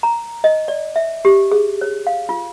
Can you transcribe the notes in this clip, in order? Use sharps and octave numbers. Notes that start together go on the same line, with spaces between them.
A#5
D#5
D5
E5
G4
G#4
C#5
F5
F4